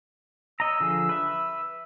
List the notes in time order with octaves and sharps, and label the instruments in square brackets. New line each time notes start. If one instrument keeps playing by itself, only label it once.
[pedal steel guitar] C#5 D#5 A#5 [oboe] E6
[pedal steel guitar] D3 F3 G#4
B4 E5